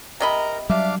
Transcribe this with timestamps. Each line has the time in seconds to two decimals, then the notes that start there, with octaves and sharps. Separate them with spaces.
0.20 C3 A#4 D#5 A#5 B5
0.70 F#3 G3 D4 E5 F5 D6